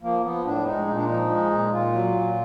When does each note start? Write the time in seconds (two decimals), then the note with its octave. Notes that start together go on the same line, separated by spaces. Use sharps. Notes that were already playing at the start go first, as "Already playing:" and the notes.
0.02 F3 A#3
0.24 F3 B3
0.45 A2 D4
0.65 G#3 D#4
0.87 A#2 D#4
0.96 D4
1.05 F3 D#4
1.30 G#3
1.50 A#2
1.71 A#2 F4
1.92 F#3
2.14 A#2